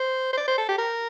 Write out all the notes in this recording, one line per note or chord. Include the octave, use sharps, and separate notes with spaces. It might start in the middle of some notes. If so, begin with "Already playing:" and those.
Already playing: C5
C5
D5
C5
A4
G4
A#4